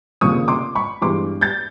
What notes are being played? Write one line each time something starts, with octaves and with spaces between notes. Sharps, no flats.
F1 D#2 C#3 F3 A#3 C#6 D#6
C6 D6
B5 C#6
G2 E3 G#3 B3 C6 D6
G6 A6